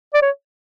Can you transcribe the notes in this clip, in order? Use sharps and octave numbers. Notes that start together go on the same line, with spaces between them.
D5
C#5